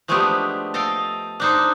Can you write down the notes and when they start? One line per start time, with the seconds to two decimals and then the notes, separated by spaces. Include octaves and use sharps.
0.08 F3 G#3 A3 B3 D4 G4
0.74 A4 D#5 F5 G5
1.40 D4 D#4 C5